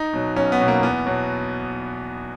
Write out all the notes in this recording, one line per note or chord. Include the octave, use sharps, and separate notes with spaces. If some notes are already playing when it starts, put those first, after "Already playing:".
Already playing: D#4
B2 F#3
B1 C#4
B3
B2 F#3
A#3
E2 B3
B2 F#3